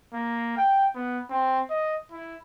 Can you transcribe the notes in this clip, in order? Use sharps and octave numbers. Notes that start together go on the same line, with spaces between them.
A#3
G5
B3
C4
D#5
E4